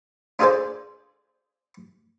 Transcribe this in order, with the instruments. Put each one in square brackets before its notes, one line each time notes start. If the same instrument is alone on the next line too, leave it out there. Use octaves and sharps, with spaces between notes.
[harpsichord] D4 F4 G#4 A4 C5 D5